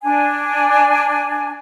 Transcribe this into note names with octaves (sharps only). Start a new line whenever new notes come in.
D4 G#5